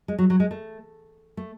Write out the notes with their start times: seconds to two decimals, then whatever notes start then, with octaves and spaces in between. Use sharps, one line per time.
0.08 G#3
0.18 F#3
0.30 F#3
0.40 G#3
0.51 A3
1.37 A3